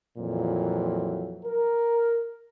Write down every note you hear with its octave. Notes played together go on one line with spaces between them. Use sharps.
F2 A#2 E3 F#3
A#4